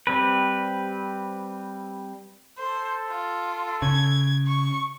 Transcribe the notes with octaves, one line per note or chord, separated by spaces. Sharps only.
G3 C4 B4
A4 C5
F4
C#3 G#6
C#6